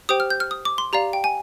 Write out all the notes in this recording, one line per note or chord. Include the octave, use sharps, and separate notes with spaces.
G4 C5 G5 D#6
F6
G6
F6
D#6
D6
C6
G4 D5 F5 A#5
G5
G#5